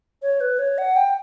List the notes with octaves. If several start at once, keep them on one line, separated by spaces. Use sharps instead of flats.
C#5
B4
C#5
F#5
G5